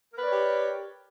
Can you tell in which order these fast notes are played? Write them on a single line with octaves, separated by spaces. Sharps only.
A#4 B4 D5 C#5 G4